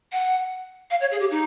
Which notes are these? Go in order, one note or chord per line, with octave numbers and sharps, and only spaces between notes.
F#5
F5
C#5
G#4
G4
D#4